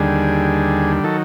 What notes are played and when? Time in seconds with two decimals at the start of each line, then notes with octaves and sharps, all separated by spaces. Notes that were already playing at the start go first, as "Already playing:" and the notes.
Already playing: D#2 D3 G3 G#4
1.04 D#3 F#3 A4